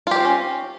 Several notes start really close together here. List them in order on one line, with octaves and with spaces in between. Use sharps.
F4 G4 C5 C4 C#4